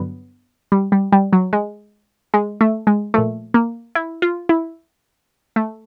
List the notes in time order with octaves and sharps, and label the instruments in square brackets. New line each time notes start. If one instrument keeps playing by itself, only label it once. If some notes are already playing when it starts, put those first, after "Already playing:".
Already playing: [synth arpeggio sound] G2 D3 F#3 B3
G3
G3
G3
F#3
G#3
G#3
A3
G#3
A#2 F3 A3
A#3
E4
F4
E4
A3